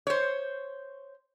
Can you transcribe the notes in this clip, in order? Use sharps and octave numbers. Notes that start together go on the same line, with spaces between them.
C5 C#5